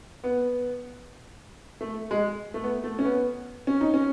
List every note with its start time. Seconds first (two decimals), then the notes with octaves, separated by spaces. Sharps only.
0.24 B3
1.81 A3
2.11 G#3
2.54 A3
2.63 B3
2.84 A3
2.99 C#4
3.05 B3
3.67 C#4
3.81 D#4
3.94 C#4